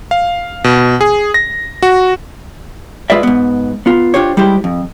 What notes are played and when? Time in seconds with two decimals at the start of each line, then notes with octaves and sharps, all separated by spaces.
0.11 F5
0.64 B2
1.01 G#4
1.34 A#6
1.82 F#4
3.10 G#3 F4 B4 D5 E5
3.23 G#2 B3
3.86 B3 F4
4.14 D4 F4 G4 C5 C#5
4.37 G3 G#3 E4 G4 C5
4.64 F2